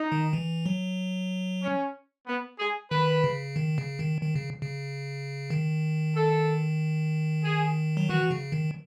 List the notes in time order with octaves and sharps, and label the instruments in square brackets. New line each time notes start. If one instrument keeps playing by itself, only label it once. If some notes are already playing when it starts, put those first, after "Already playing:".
Already playing: [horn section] D#4
[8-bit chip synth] D#3
E3
F#3
[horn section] C#4
B3
G#4
[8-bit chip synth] D#3 [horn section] B4
[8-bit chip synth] C#3
D#3
C#3
D#3
D#3
C#3
C#3
D#3
[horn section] A4
G#4
[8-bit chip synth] F#3
[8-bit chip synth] E3 [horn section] F#4
[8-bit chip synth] C#3
D#3